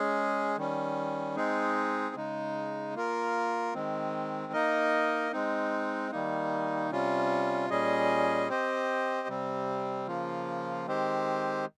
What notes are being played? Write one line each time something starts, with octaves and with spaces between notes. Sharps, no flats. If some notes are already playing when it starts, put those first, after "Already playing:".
Already playing: G#3 C#4 G#4
D#3 G3 C#4
G#3 C4 D#4 G#4
C#3 G#3 D#4
A#3 F4 A#4
D#3 G#3 C4
A#3 D#4 A#4 D#5
G#3 C4 D#4
D#3 G3 A#3 D#4
C3 G3 C#4 F4
A#2 G3 C#4 G#4 D#5
C4 G4 C5 D#5
C3 G3 C4
C#3 F3 A#3 F4
D#3 G#3 C4 G4 C5